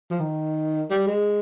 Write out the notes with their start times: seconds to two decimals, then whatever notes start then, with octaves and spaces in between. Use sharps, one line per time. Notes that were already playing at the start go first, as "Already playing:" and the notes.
0.10 F3
0.20 D#3
0.90 G3
1.07 G#3